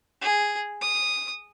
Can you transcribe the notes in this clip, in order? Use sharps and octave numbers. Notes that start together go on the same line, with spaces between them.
G#4
D#6